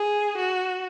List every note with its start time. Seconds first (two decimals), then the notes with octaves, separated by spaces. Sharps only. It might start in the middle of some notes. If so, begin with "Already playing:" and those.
Already playing: G#4
0.37 F#4